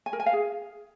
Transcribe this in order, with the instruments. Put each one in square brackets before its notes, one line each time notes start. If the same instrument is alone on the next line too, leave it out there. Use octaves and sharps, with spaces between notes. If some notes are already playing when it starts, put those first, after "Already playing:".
[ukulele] G#5
A#4
G#5
F5
G#4